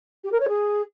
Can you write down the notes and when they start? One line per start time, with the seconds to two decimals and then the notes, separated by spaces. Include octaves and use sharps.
0.24 G4
0.32 A#4
0.40 C#5
0.48 G#4